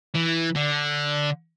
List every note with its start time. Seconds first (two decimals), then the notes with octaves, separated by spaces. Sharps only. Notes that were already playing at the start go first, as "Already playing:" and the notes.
0.14 E3
0.55 D3